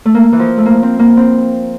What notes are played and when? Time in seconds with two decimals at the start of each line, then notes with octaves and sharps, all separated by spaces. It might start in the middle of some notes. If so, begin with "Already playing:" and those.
0.05 A3
0.14 A#3
0.32 E3
0.39 F3
0.58 A3
0.66 A#3
0.83 C4
0.99 A#3
1.17 C4